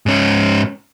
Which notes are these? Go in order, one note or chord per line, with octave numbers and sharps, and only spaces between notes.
G#2 C#4